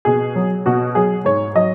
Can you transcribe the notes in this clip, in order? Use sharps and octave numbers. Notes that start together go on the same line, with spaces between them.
B2 G#4
F#3
B2 F#4
F#3 G#4
G#2 C#5
F#3 D#5